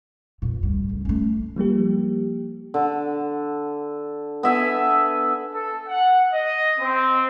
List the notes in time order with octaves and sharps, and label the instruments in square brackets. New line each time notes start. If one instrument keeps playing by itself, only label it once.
[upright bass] F2 A#2
D2 G2
C#2
A3 C#4
[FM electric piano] F3 G3 A#3 G4
[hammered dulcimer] D3
B3 E5 G#5 A5
[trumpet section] A4
F#5
D#5
C4